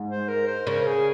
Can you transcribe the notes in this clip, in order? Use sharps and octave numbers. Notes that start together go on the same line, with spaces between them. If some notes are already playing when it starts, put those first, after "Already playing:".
Already playing: G#2
C5
A#4
C5
C#3 A#4
G#4